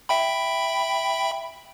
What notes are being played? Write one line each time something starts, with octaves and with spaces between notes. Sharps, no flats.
E5 G5 B5